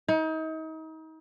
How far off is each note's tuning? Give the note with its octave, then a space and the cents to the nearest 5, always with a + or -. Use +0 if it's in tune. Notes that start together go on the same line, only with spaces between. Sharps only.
D#4 +35